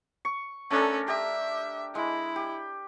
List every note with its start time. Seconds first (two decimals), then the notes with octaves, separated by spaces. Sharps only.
0.25 C#6
0.70 A3 C#4 D4 A4 A#4
1.08 G4 E5
1.95 G#3 E4
2.36 G4